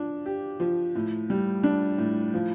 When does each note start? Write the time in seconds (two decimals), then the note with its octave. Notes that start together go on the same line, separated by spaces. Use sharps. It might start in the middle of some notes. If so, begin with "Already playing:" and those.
Already playing: F3 D4
0.26 G4
0.60 F3
0.95 A2
1.30 G3
1.64 D4
1.98 A2
2.34 F3